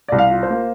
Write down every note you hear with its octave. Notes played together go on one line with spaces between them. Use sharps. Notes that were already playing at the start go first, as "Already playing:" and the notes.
C2 D5
F5
F4
C5
A#3